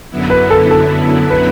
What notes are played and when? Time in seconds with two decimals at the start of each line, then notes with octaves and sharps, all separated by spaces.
0.10 F#2 D3 F#3 B3 E4
0.30 B4
0.50 A4
0.71 A4
1.30 B4